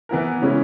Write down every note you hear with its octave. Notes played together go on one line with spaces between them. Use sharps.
E3 B3 E4 A#4
C#3 G#3 C#4 E4